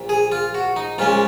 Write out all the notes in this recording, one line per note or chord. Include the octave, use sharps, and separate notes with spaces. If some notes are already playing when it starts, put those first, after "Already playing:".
Already playing: A#1 A#2
G#4
F4
F#4
D#4
A#1 A#2 G#3 C#4 F4